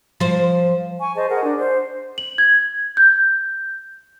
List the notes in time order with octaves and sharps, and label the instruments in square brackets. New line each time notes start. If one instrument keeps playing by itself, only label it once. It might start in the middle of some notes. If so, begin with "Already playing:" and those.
[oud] F3 C5
[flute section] G#5 C#6
G#4 C5 D#5 A5
G#4 A#4 F#5
D4
C5
[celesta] F#7
G#6
G6